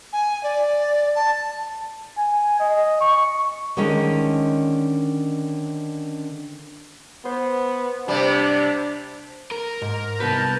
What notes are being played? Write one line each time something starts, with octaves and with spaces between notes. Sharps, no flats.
G#5
D5
A5
G#5
D#5
C#6
D3 D#3 G#3 C#4 D#5
B3 C5
C3 G3 D4
A#4
G#2
C2 B3 B4 A5 G6